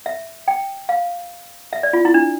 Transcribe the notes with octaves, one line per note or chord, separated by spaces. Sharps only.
E5
G5
F5
E5
D5
F4
E4
D4